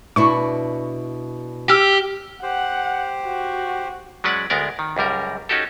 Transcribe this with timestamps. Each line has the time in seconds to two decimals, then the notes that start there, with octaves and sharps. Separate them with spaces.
0.16 B2 D4 E4 C#6
1.70 G4 E6 F6
2.43 G4 C5 F#5
3.26 F#4
4.24 F#3 G#3 C#4 B4 D5 F#5
4.50 D2 G#3 B3 A#4 D5
4.79 D#3
4.96 C#2 F#2 G3 A#4
5.49 C#4 D#4 F#4 G4 A4